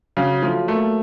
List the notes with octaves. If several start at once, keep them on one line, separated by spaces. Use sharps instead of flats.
C#3 F#3
F3 A3
A3 A#3